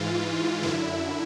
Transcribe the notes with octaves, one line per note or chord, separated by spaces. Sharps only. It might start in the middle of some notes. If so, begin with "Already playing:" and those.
Already playing: G#2 E3 F4
F#2 D3 E4